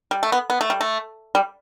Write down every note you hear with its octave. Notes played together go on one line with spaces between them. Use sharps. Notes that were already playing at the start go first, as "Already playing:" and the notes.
G3
A3
B3
B3
A3
G3
A3
G3